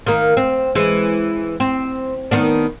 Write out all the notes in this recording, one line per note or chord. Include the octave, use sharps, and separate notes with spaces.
D#3 A#3
C4
E3 G#3
C4
D#3 B3 D4